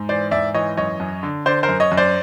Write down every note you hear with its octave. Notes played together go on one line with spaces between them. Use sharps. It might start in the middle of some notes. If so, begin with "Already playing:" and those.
Already playing: G#2
E3 C5 D5
G#2 D5 E5
E3 C#5 D#5
F#2 C#5 D#5
F#2
D3
D3 C5 D5
A#4 C5
F#2
C#5 D#5
F#2
C5 D5